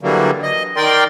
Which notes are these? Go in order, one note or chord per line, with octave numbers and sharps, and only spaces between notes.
D3 E3 F#3 G3 A#3
D#5
D#3 A#4 D5 G5 C6